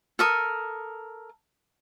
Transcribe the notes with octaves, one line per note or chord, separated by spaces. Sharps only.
A4 A#4 D#6